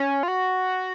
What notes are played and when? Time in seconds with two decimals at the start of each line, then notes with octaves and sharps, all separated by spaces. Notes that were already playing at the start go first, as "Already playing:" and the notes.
Already playing: C#4
0.23 F4
0.28 F#4